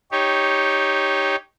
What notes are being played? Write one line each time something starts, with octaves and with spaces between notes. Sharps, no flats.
D#4 G4 C#5